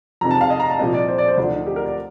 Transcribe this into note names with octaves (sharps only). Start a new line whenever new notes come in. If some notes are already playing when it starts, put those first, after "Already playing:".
F2 C3 D#3 A#5
A5
F5
D#5
A#5
A5
C2 A#2 F3 D#5
D5
C5
D5
C5
D2 D3 F3 D4
D#4
G4
A#4
D5